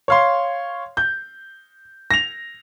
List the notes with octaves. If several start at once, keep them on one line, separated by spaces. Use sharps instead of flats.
C#5 F5 C6
G6
A#6 F7